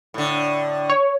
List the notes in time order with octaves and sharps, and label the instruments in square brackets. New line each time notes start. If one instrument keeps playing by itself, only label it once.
[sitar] A2 D3
[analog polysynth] C#5